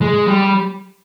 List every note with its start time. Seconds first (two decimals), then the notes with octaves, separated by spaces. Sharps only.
0.02 G#3
0.28 G3